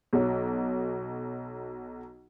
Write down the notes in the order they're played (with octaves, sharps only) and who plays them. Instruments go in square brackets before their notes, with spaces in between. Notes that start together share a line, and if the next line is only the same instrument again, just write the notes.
[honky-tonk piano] B1 F#3